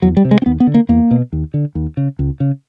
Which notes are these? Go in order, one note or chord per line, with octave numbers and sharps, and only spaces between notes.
E2 F#3
G3
C3
G#3
C4
D#2 B3
B3
D3
A#3
E2 A#3
B2
D#2
D3
D#2
C#3
C#2
C#3